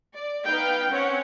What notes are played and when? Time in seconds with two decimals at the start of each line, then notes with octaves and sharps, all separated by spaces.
0.15 D5
0.45 B3 D#4 B4 F5 G5
0.90 C4 C#4 C#5 F#5